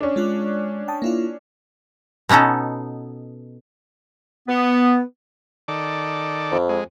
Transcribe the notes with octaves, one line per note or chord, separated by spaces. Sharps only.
C#4 D4
G#3 F4 F#6
G5 A5 D#6
A#3 E4 F4
B2 B3 C#4 D#4 A4
B3
D#3 A4 D5
F2
G#3